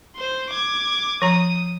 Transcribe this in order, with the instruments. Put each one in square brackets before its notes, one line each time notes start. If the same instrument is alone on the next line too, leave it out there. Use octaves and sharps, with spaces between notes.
[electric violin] C5 C6
D6 G#6
[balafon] F3 A#5 [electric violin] D#6